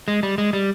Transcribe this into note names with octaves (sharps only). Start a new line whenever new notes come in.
G#3
G3
G#3
G3